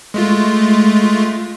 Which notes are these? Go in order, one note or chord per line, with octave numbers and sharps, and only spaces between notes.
G#3 A3 F4